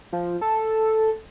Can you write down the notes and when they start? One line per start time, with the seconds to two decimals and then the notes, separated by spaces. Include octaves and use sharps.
0.13 F3
0.41 A4